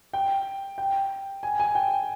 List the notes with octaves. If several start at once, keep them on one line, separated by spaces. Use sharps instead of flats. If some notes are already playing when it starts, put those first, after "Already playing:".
G5
G5
G#5
G#5
G5